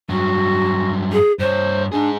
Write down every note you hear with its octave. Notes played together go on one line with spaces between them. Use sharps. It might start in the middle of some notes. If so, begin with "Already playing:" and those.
G2 F#3 F#4
G#4
G2 C5 C#5
D4 D#4 G#4